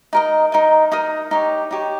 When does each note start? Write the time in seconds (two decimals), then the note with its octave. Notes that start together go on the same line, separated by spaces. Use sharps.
0.13 D#4 A#4 D#5
0.52 D#4 A#4 D#5
0.92 D#4 A#4 D#5 D#6
1.31 D#4 G4 C#5
1.71 D#4 G4 C#5